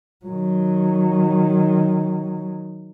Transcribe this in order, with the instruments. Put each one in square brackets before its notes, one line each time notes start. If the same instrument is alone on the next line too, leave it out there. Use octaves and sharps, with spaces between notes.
[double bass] D#3 F#3